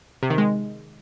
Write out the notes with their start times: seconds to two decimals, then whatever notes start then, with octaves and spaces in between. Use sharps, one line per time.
0.23 C3
0.30 D#3
0.38 G#3